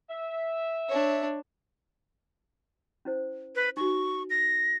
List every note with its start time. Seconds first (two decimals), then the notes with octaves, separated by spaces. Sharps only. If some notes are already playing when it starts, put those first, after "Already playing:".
0.10 E5
0.89 D4 C#5
3.05 C#4 E4 C5
3.55 B4
3.77 D#4 F#4 C#6
4.30 A#6